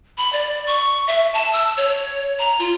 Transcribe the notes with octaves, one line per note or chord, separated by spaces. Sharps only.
B5
D5
C#6
E5
A5
E6
C#5
A#5
F4